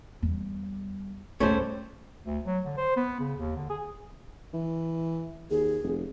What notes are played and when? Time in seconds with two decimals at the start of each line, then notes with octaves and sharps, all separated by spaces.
0.22 E2 G3
1.40 A#1 D#2 G3 A3 C#4 A4 C5 C#5
2.26 D2
2.45 F#3
2.65 D3
2.77 C5
2.96 B3
3.20 C#3
3.36 D#2
3.56 D3
3.70 G#4
4.54 E3
5.51 D#2 G#4
5.83 F1